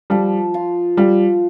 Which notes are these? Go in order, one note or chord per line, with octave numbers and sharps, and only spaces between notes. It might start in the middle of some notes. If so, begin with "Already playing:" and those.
F3 G3
F4
G3 F4